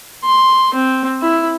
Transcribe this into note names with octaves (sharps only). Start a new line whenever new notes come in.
C6
C4
E4